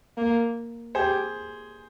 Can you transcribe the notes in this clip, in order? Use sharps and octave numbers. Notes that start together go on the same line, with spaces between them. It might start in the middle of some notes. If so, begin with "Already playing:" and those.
A#3
G4 G#4 C5